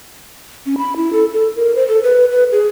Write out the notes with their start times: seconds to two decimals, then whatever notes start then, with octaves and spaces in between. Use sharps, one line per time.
0.66 C#4
0.78 B5
0.96 E4
1.13 A4
1.34 A4
1.56 A#4
1.75 C5
1.88 A4
2.03 B4
2.31 B4
2.52 G#4